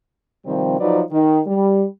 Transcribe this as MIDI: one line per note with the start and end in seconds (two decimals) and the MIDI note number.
0.46 0.75 48
0.46 0.75 51
0.46 0.75 53
0.46 0.75 55
0.46 0.75 60
0.80 1.00 53
0.80 1.00 54
0.80 1.00 63
0.80 1.00 71
0.80 1.00 74
1.11 1.39 51
1.46 1.84 55